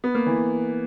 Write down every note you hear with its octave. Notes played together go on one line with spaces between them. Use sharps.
B3
A#3
E3